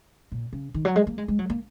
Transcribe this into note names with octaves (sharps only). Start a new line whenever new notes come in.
A#2
C#3
D#3
F#3
G#3
A#3
G#3
G#3
F#3
A#3